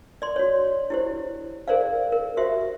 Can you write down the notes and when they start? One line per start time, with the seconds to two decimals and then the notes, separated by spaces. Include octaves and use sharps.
0.22 D5 C6
0.36 F#4 C#5
0.90 E4 G4 C5
1.68 G#4 A#4 C5 D5 F5
2.12 A#4
2.37 F#4 G4 C5 E5